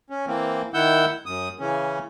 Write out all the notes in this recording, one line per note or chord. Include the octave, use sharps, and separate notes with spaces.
C#4
E3 A#3 C4
D#3 E4 F#5 E6 G6
F#2 D#6
C#3 E3 C#4